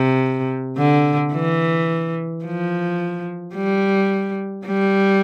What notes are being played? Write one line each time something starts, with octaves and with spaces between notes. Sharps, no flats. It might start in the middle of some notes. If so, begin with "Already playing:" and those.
Already playing: C3
D3
E3
F3
G3
G3